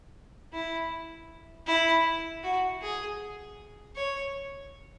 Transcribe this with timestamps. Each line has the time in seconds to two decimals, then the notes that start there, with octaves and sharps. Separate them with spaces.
0.53 E4
1.67 E4
2.43 F#4
2.82 G#4
3.96 C#5